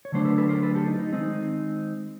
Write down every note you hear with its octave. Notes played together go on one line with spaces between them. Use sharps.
C#5
D3 F#3 A3 D4 C5
A4 B4
A4 B4
A#4 C5
A4 B4
G4 A4
D#4
D#4
D#3 G#3 C4 D#4